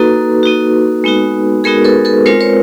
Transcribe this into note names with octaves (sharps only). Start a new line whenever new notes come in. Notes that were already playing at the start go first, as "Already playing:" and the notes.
Already playing: A#3 D#4 F#4 A4 B4
A#3 D#4 F#4
G#3 B3 D#4 F#4
G#3 B3 D#4 F#4 G#4 A#4
A4 B4
A4 B4
G#3 C4 F4 A#4 C5
B4 C#5